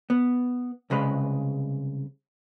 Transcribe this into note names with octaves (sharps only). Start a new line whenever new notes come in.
B3
C2 C#3 G#3 B4